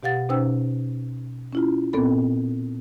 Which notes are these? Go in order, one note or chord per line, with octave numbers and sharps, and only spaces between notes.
B2 G4 F5 F#5 A6
B2 C#4 D#4 C5 G5 E6
C#4 E4 F4
A#2 B3 C4 A4 B5